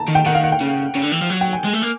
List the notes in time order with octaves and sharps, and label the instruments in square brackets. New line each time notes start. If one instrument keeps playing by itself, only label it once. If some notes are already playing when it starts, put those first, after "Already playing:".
Already playing: [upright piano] A5 A#5
[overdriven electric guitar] D#3
[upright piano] G5
[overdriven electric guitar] D#3 [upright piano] F#5
[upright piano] F5
F#5
G5
[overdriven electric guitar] C#3
C#3
D3
E3
F3
F#3
[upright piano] G5
G#5
[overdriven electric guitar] G#3
A3
A#3